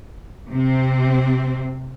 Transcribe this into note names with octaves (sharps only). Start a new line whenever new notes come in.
C3 C4